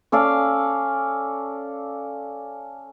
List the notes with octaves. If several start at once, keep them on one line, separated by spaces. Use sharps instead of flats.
C#4 A4 D5 F5